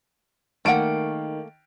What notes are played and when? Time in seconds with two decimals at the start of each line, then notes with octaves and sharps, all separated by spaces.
0.65 D#3 A3 A#3 F#5 D7